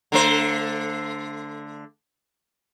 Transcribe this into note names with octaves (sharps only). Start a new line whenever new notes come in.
D3 A3 C5